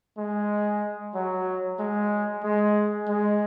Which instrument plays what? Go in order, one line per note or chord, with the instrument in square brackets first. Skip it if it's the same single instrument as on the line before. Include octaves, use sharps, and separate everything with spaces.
[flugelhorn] G#3
F#3
G#3
G#3
G#3